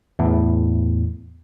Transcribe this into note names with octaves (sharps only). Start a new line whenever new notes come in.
E2 A2